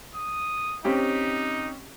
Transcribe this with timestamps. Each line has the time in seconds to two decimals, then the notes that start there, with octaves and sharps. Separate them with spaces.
0.15 D#6
0.85 C4 C#4 D#4 G4